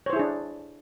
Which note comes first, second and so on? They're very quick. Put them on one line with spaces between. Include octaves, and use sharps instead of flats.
C#5 C5 E4 G#4 D4